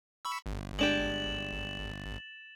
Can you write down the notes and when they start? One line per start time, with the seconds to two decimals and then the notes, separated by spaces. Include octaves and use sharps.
0.25 B5 C#6 E6
0.46 G1
0.79 G#3 D4 G4 A6 E7 F#7